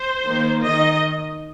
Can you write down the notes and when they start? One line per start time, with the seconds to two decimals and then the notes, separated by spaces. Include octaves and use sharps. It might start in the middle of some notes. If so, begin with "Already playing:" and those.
Already playing: C5
0.26 D#3 A#3
0.64 D#3 D#5